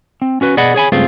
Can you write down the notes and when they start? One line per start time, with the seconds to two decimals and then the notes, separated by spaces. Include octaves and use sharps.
0.22 C4
0.41 C#4 F#4 B4
0.57 B2 G#4 D5 D#5 F#5 B5
0.74 G#4 C#5 G#5 B5
0.92 C#2 G2 A3 C4 F4 G#4